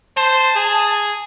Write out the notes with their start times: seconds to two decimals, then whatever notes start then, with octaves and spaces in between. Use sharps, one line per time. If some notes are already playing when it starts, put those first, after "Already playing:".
0.17 C5 A5
0.56 G#4